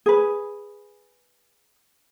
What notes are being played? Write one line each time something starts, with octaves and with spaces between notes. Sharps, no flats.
G#4 B4